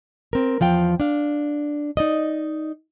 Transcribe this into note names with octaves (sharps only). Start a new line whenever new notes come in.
C4 A#4
E2 F3 F5 G5
D4 F5
D#4 D5 D#5